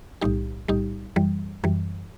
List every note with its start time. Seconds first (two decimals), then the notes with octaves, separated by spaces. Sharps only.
0.21 B1 A2 G3 D#4 G4
0.68 B1 A2 G3 D#4 G4
1.16 F#2 E3 G3
1.64 F#2 E3 G3